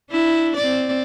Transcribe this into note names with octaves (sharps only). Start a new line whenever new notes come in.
D4 E4
C4 D5